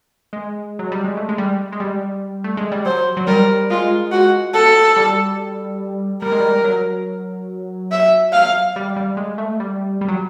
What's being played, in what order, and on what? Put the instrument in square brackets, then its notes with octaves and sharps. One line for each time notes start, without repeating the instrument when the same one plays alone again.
[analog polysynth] G#3
F#3
G3
G#3
A3
G#3
G3
G#3
G3
A3
G#3
G3
[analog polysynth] F#3 [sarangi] C5
[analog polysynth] F#3
[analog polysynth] G3 [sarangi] A#4
[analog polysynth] G#3 [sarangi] F4
[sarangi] F#4
A4
[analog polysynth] G3
[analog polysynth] G3 [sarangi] A#4
[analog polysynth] G#3
G3
F#3
[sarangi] E5
F5
[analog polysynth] G3
G3
G#3
A3
G3
G3
F#3